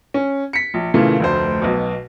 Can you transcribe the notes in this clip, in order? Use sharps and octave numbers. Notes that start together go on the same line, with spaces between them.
C#4
B6 C#7
A#1
A#2 C#3 E3 A3
F1 D2 C5
B1 B2